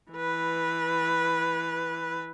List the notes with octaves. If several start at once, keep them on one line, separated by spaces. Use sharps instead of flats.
E3 B4